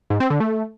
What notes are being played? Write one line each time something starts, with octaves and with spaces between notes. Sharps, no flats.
G#2
C4
D3
A3